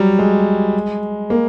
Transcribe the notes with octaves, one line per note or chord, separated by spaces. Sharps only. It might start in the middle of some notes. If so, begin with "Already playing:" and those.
Already playing: F#3 G3
G#3
A#3